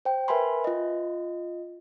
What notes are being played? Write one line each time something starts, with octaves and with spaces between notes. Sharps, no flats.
C5 G5
A#4 B4 E5 G#5 B5 C6
F4 D#5